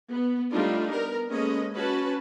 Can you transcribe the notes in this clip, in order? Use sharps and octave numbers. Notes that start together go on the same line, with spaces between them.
B3
G3 A3 D4 D#4 F4
B3 A#4
G#3 A#3 C#4 A4 B4 D#5
C#4 F#4 B4 A5